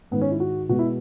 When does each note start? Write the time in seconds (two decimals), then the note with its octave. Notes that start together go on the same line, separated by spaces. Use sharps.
0.11 G#2 D#3 G#3 B3
0.21 C#4
0.31 E4
0.40 F#4
0.69 B2 G#3 F#4
0.79 E4